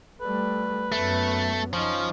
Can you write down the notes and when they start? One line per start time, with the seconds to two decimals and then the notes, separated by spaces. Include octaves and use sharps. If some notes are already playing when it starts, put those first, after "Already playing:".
0.21 G3 A3 B4
0.92 F#2 A3 B3
1.73 F3 C#4 D#4